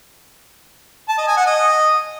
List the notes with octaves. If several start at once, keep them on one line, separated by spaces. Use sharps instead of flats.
A5
D#5
G#5
F#5
D#5